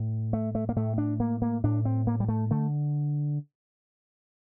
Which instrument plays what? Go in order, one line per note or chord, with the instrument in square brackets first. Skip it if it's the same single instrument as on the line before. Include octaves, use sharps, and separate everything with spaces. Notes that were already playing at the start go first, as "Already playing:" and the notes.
Already playing: [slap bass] A2
A3
A3
A#3
A2 A3
D4
A#3
A#3
A2 D4
C4
A#3
G3
A3
D3 A3